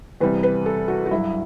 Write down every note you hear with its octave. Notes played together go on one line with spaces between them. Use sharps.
E2 C3 G3 B4
B4
A4
F#4
F#4
G2 F#3 E4